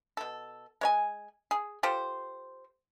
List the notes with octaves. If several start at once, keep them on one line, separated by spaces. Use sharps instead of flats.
B2 A4
G#3 C#5 G#5
G#4
F4 G4 A4 C5